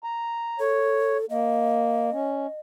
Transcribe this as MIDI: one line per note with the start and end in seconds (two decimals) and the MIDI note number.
0.04 0.59 82
0.60 1.26 69
0.60 1.18 73
1.30 2.10 58
1.30 2.60 75
2.13 2.47 61